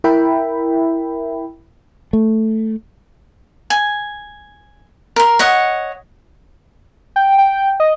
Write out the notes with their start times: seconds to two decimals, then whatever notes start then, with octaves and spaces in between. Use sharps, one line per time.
0.04 E4 A#4 E5 G5 B5
2.13 A3
3.70 G#5
5.16 A#4 C6
5.39 C#5 D#5 F#5
7.16 G5
7.38 G5
7.80 D#5